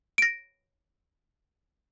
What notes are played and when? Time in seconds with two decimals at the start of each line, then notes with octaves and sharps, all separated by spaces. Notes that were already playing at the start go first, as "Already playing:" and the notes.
0.18 A#6 D7